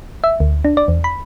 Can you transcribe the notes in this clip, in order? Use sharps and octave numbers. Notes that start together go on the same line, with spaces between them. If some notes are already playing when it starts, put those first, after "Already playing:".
E5
D2
D4
D5
E2
B5